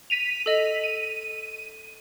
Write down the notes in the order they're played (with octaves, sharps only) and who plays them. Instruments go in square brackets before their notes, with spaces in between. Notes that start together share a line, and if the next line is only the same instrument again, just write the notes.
[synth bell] B6 D#7 F7
[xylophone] A4 D#5
[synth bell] D#7